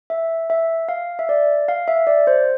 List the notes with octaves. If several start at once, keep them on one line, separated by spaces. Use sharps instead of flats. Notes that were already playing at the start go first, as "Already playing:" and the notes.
E5
E5
F5
E5
D5
F5
E5
D5
C5